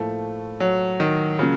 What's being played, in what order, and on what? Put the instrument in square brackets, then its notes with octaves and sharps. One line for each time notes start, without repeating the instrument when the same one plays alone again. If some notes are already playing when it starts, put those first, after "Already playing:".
Already playing: [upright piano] A2 F3 A#3 [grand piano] A3
[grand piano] F#3
D#3
[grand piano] C#3 [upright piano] F#3 A#3 C#4 F4